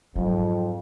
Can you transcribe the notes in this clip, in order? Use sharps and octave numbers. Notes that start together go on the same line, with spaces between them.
F2 G#2 F#3